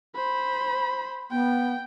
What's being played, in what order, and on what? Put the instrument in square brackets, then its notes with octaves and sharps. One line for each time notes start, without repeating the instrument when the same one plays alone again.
[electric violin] C5 B5
[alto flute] B3 [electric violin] G5